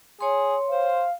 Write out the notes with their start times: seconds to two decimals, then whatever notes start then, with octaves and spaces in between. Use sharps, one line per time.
0.21 G#4 C#5 C6
0.70 C5 F5